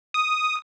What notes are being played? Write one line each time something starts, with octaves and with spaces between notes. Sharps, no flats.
D#6